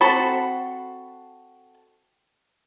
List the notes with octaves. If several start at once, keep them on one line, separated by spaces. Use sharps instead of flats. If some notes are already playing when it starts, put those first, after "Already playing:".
C4 F#4 A4 A5 B5